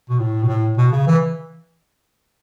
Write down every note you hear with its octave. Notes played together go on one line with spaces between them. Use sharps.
B2
A2
B2
A2
B2
C#3
E3